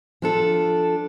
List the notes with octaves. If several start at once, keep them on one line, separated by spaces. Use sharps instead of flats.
F3 D4 A4